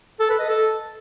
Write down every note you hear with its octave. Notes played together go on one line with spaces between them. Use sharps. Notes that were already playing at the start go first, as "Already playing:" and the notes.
A4
B4
D#5
A4